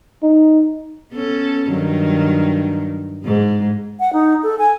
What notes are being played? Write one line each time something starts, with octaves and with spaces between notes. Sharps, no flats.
D#4
B3 C#4 A4
G2 D#3 F#3
G#2 G#3
F#5
D#4
A4
G#5